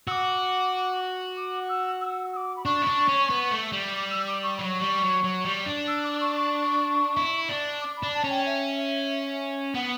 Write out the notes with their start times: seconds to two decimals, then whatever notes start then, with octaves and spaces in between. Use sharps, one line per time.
0.07 F#4 D6 E6
1.37 D6
1.69 E6
2.01 E6
2.33 E6
2.36 D6
2.57 B5
2.65 D4 C#6
2.82 E4
2.87 D4
3.08 C#4
3.30 B3
3.51 A3
3.73 G3
3.94 D6
4.11 E6
4.27 D6
4.43 C#6
4.56 F#3 B5
4.69 C#6
4.80 G3
5.02 F#3
5.23 F#3
5.45 G3
5.66 D4
5.88 E6
6.04 D6
6.21 C#6
6.37 C#6
7.17 E4
7.49 D4
7.81 D6
7.97 B5
8.03 D4
8.14 A5
8.24 C#4
8.30 G5
8.46 E5
9.75 B3 F#5